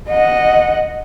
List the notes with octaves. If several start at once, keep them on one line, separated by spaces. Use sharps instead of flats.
D#5 F#5